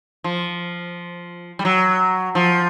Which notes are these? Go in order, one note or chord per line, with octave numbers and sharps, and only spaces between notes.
F3
G3
F#3
F3